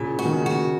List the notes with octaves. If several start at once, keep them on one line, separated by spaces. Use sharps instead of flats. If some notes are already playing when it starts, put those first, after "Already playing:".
Already playing: A#2 C#3
F#4
D#3
C#3
F#4